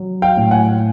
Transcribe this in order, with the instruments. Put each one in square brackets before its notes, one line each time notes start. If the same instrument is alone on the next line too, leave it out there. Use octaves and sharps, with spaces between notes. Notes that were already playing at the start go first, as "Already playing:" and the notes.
Already playing: [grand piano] F#3
F5 G5
A2
F#5 G#5